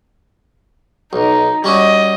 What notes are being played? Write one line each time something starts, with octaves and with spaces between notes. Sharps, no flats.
B1 D#4
G3 C#4 F#4 D#5